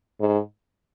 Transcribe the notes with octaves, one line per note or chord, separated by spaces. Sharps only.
G#2